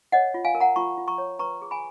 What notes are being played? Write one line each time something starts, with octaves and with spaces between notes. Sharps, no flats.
C#5 D#5 F#5
F4
F5 G#5
A#4
F#5 A#5
F4 A#5 C#6
F4
A#5 C#6
C#5
B4 A#5 C#6
G#4
G#5 B5